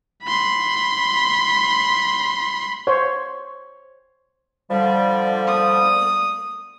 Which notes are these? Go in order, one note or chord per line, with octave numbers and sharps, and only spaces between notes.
B5 C6
C5 C#5
D3 F3 G3
D#6